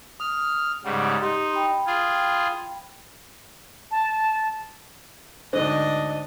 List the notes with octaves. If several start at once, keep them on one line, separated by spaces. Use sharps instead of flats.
D#6 F6
G#2 C#3 G3 F#5 D6
D#4 G4 C6
G5 B5
F4 G#4
A5
D2 G#2 D3 D4 C5 D#5